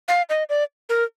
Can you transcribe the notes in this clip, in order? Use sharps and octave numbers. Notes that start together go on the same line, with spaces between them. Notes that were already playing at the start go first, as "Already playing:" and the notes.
F5
D#5
D5
A#4